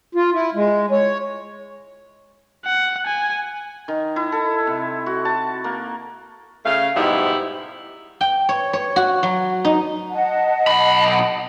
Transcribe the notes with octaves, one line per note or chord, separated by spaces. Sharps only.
F4
E4
G#3
C#5
F#5
G#5
D#3
E4
A4
C3
F#4
A5
A#3
C#3 A3 F5
G#2 B2 F3 G3 E4
G5
C#5
C#5
F#4
F#3
D#4
D#5 F#5 A5
B1 B5